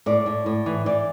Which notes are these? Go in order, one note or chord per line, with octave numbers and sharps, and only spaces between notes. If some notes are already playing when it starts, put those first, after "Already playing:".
A2 D5
A2
A2
E3
E3 D5